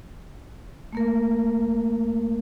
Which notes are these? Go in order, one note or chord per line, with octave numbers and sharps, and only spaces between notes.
A3 A#3 A#4